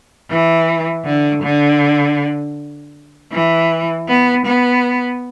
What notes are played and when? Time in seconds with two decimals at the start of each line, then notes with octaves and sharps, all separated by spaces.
0.30 E3
1.05 D3
1.43 D3
3.32 E3
4.08 B3
4.46 B3